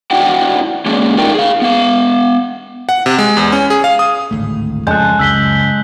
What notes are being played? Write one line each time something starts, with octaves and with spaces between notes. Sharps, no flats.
D4 E4 F#4 D5 F#5 G5
G#3 A#3 C#4 D4 G#4
A3 D4 D#4 F4 A#4 G5
G#4 F5
B3 F5
F#5
C3
G#3
E2
C#4
G#4
F5
D#6
G#1 D2 A2 A3
F2 C#3 G#3 C#4 A4 A5 F#6 G6
C#2 F#2 C#3 E6 B6 G7